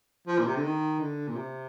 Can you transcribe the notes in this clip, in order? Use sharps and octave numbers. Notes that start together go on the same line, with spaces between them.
F3
A#2
C3
D3
D#3
D3
A#2
C3